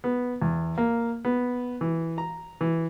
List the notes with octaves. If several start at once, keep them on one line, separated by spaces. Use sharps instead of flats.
B3
E2
A#3
B3
E3
A#5
E3